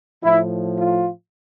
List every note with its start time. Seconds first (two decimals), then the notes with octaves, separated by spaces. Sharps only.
0.24 A2 F3 E4
0.77 F4